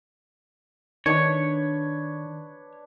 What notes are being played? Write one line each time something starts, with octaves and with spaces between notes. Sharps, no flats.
D#3 D4 B4 C#5